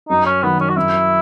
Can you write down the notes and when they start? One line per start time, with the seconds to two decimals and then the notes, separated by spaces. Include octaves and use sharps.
0.09 F#2 D#4
0.26 C#4
0.43 D#3 F#3 B3
0.60 C#4
0.69 F#4
0.76 F#2 E4